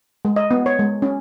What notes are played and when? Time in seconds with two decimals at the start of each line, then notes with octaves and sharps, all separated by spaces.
0.25 G#3
0.36 D#5
0.51 B3
0.66 C#5
0.79 G#3
1.02 C#4